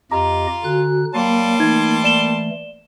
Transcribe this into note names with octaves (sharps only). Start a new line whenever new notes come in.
F2 F4 G4 D#5 A#5
D3 F#4 G#5 F#6
F#3 G3 A#3 A#4 D5 F5 A5 C6
E3 A3 D#4 G#6
D5 E7 G7